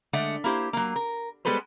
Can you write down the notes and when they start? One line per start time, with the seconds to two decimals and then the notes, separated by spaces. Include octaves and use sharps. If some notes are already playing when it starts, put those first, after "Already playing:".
0.13 D3 G#3 A3 D5 F#5
0.44 A#3 E4 G4 C5
0.73 F#3 A#3
0.96 A#4
1.45 G3 G#3 B3 A4 B4 C5